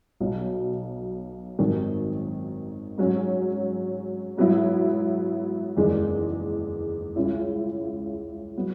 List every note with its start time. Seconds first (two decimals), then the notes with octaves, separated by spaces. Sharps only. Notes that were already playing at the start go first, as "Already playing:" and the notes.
0.20 B1 B2 F#3
1.59 G#1 F#2 D#3
2.98 G#2 F#3 C#4
4.37 G#2 F#3 B3 E4
5.77 F#1 E2 D#3 G#3
7.16 C#2 C#3 G#3 C#4 E4
8.57 F#3 B3